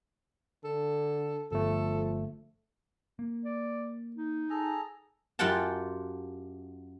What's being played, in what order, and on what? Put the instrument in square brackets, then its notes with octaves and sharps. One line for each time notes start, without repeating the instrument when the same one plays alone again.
[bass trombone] D3 [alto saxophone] A4
[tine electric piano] G1 A3 [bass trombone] F3 [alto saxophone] A4
[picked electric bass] A#3
[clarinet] D5
D#4
[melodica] G#4 A4 A#5
[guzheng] F#2 F4 G4 F#5 G5 A5